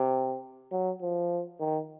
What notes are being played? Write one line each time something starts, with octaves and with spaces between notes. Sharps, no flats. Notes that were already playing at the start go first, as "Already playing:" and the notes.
Already playing: C3
F#3
F3
D#3